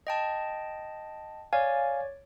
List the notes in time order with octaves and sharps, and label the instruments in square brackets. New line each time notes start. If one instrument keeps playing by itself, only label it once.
[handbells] D#5 G5 A5
[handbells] C#5 D5 [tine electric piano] F5 G#5